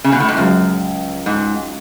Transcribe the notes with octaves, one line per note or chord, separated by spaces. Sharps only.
C#3
B2
A2
G#2
C#2 F#2 C#3 F#3
G#2